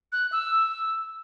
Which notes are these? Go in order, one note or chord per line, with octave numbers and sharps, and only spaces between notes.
F#6
E6